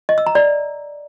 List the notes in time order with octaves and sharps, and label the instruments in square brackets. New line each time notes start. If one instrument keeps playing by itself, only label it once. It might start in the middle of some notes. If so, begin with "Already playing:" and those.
[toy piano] D#5
E6
A#5
D5